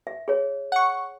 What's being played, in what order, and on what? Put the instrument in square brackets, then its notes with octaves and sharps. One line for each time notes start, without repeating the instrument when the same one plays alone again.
[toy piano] E5
G#4 C#5
[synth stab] F#5 C#6